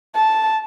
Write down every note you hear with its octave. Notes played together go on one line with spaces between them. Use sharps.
A5